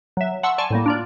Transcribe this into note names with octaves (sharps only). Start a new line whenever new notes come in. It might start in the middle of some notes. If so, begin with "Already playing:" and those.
F#3 E5
F#5 A5 C6 C#6 E6
D5 G#5 A5 C6 C#6
A2 G3 A#3
D4 F4 D5